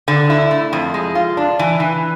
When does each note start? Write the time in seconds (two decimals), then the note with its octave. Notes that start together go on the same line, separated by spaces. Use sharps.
0.08 D3
0.30 E4
0.51 A3
0.73 F2
0.94 G#3
1.15 F4
1.37 D4
1.59 E3
1.80 E3